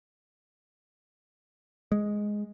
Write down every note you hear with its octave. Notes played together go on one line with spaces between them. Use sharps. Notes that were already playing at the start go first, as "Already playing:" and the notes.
G#3